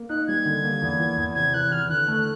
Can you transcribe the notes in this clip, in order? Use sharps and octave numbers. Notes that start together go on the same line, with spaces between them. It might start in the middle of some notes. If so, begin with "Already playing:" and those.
Already playing: A#3
D#4 F#6
G3 G#6
D3
A#3
E2
E3
E2
C3 G#6
E2 F#6
E3 F6
D3 F#6
A3